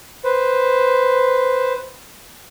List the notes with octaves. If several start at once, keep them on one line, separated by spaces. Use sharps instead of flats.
B4 C5